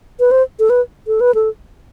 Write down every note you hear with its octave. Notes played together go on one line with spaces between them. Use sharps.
B4
C5
A4
B4
A4
B4
A4